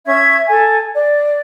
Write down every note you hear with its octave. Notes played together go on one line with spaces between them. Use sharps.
C#4 E5 G#6
A4 G#5
D5